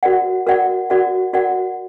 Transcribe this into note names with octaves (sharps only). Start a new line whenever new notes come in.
F#4 A#4 D5 F#5
F#4 A#4 D5 F#5
F#4 A#4 D5 F#5
F#4 A#4 D5 F#5